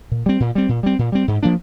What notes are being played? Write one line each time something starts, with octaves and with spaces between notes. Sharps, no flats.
A#2
G3 C4
A#2
G3 C4
A#2
G3 C4
A#2
G3 C4
G#2
F3 A#3 D4